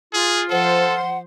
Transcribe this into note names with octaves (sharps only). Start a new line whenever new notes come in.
F4 G#4
F3 A4 C5 F#5 C6